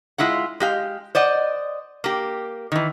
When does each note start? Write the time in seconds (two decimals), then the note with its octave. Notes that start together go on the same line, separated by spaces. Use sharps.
0.18 G#3 E4 F4 F#5
0.60 G#3 G4 F5
1.15 C5 D5 D#5 F#5
2.04 A#3 G4
2.72 D#3 E3